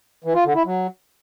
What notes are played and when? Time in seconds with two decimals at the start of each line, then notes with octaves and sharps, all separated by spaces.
0.24 E3
0.34 F4
0.45 D3
0.55 E4
0.65 F#3